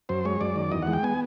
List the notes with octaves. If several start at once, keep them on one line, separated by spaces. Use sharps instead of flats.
F#2 C5
G#3 C#5
F#2 D5
D#3
E2 D#5
G#3 F#5
G5
B3 G#5